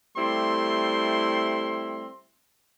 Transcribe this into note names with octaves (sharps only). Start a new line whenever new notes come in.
G3 A3 C4 E4 C6